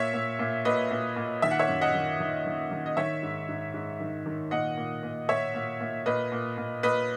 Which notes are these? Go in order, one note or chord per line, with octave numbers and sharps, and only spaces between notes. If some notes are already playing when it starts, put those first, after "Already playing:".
Already playing: A#2 C#5 E5
A#2
A#2
A#2 B4 D#5
A#2
A#2
D#3 E5
F#5
C#5 E5
F#2
D#5 F#5
D#3
D#3
D#3
D#3
D#5
D#3 C#5 E5
G#2
G#2
G#2
D#3
D#3
A#2 D#5 F#5
A#2
A#2
A#2 C#5 E5
A#2
A#2
A#2 B4 D#5
A#2
A#2
A#2 B4 D#5